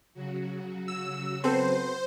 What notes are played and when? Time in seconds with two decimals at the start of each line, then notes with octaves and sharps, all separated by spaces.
0.14 C#3 F#3 F#4
0.88 E6
1.44 B3 C4 A4 C5